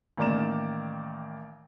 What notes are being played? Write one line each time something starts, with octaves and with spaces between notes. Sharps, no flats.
A1 D#3 A#3 D5 A#5 E7